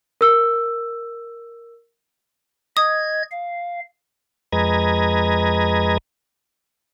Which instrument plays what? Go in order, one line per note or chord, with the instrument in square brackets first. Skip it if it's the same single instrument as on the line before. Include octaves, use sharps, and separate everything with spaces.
[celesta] A#4 E6
[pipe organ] D#5 G#6 [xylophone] D#6
[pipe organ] F5
[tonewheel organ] F2 G#3 B4 D#5 A#5 G#6